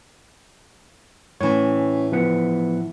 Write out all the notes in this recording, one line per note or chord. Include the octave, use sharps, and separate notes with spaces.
A2 E3 C#4 C#5
F3 B3 F#5